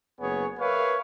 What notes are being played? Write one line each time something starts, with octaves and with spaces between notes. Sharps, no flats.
F#1 B3 G#4 C#5
A#4 B4 C#5 E5 F5